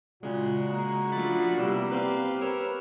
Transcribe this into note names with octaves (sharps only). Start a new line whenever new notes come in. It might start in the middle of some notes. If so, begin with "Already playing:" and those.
A#2 C#3 G#3 F#4
A#3
F3 A3 D4 B5 A6
C3 G3 B3 E4 E6
C4 G4 B4 F5
A#4 B4 C#5 E6 F6